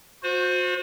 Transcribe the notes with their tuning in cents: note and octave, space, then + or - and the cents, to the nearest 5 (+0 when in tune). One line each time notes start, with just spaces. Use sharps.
F#4 -35 C5 +0